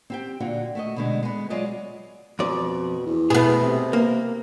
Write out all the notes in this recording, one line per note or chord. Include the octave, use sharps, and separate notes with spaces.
C4 G4 G5
A#2 D3 F4 F#4
A3 F#4 D#5
B2 D3 G#3
G#3 B3
F#3 G#3 F4 D5 D#5
F2 B2 D5
E2
B2 A3 B3 G#4
C3
A#3